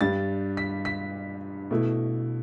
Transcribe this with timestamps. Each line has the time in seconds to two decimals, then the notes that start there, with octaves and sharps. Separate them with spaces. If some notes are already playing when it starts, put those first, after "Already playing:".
0.01 G2 G3 D4 A6
0.57 B6
0.85 B6
1.71 B2 A3 E4